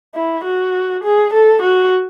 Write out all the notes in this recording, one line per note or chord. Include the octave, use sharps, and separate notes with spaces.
E4
F#4
G#4
A4
F#4